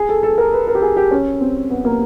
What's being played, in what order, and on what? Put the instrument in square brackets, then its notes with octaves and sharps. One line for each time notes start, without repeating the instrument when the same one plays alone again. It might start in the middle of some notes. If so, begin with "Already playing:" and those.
Already playing: [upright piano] G#4
A4
A4
A#4
B4
A#4
G4
G#4
G4
C#4
C4
B3
A#3